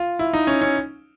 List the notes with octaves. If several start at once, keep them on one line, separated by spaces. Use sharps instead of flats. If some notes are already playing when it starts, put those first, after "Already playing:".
Already playing: F4
E4
D#4
C#4
C#4